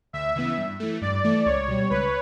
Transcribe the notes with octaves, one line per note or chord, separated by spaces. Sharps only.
D2 E5
C#3 E3 B3
G2
E3 A3
G2 D5
E3 A3
C#2 C#5
B2 G3
C#2 B4